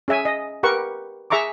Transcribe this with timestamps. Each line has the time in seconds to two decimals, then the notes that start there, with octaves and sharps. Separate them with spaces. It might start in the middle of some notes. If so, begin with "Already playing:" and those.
0.08 C#4 G#4 E5 G#5
0.25 D#5
0.63 G4 A#4 B4 F#5 C#6
1.30 G#4 E5 A#5 C#6 D6